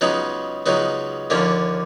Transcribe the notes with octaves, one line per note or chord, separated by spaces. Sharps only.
C#2 C#3 F#3 B3 D#4
C#2 C#3 F#3 B3 D#4
D#2 D3 F3 A#3 C#4